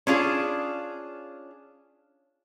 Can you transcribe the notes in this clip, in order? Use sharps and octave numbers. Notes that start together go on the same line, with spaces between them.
C#4 D4 F4 G#4